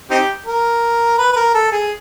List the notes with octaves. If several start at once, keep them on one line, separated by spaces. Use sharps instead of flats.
C4 D#4 G4
A#4
B4
B4
A#4
A4
G#4